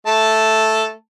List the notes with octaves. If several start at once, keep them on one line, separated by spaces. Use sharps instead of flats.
A3 A5